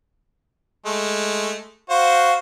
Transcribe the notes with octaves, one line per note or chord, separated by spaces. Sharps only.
G#3 A3
F#4 C5 F5